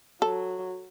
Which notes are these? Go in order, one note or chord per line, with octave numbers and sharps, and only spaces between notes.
F#3 A4